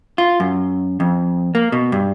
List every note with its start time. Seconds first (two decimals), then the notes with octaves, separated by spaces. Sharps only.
0.18 F4
0.40 F#2
1.00 F2
1.55 A#3
1.72 B2
1.92 G2